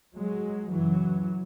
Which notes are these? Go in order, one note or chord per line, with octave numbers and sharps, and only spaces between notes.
F#3 G#3
F#2 C#3 E3 F#3